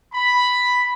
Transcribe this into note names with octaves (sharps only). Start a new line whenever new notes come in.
B5